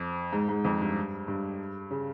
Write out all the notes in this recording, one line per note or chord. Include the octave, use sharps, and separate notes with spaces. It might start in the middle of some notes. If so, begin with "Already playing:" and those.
Already playing: F2
G#2
G#2
F2
G2
G2
C#3